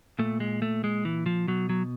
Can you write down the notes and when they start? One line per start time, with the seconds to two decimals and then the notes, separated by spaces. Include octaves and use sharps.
0.19 A#2 A3
0.40 G#3
0.62 A3
0.84 G#3
1.05 E3
1.26 F3
1.47 B2 F#3
1.69 F#3